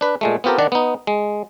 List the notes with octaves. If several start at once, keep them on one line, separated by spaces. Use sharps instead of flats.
D4 B4
A#2 G#3 A3
B3 C4 F4 G4 A4 A#4
D#3 D4 D5 F#5
B3 D#4
G#3